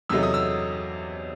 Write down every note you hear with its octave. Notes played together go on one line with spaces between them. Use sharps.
E2 C3 F#3 A3 D#4 E6
D#6
E6